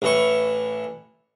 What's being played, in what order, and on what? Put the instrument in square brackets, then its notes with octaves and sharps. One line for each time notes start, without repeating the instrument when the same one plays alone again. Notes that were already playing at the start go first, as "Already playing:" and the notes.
[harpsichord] A1 E3 C#6